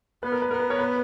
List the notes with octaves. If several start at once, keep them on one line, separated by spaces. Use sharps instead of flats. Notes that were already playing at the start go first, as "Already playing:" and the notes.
B3 B4
A#4
B4
B3 A#4
B4
A#4 C#5
B4